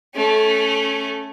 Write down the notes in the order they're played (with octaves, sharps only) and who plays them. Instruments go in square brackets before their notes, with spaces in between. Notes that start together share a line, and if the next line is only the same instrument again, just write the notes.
[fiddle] A3 C#4